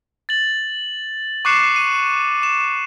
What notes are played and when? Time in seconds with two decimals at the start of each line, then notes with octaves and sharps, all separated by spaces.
0.29 A6 F#7
1.45 C#6 D6 F#6 C7 C#7 E7
1.76 D#7
2.43 E7